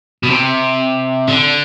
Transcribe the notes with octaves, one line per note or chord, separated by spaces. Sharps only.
B2
C3
D3